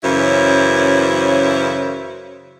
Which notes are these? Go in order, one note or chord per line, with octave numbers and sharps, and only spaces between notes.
F#2 C#3 E3 E4 C5 C#5